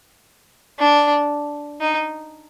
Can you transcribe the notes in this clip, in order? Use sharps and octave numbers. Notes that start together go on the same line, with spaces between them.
D4
D#4